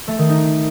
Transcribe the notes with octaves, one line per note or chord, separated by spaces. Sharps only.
A3
D#3
D#4